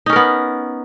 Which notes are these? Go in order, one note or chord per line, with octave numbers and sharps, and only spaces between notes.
B3 C#4 D#4 A#4